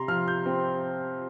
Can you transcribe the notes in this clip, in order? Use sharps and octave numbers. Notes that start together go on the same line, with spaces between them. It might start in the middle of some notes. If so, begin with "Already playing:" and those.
Already playing: C3 A#5 C6
F3 F6
G6
C4